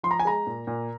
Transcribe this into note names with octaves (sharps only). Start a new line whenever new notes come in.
F3 C6
A#5
G#5
G#3 A#5
A#2
A#2